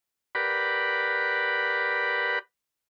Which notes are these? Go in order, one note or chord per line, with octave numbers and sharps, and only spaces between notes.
G4 A#4 B4 D5 F#5 B5